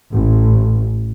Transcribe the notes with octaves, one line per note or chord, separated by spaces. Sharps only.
A1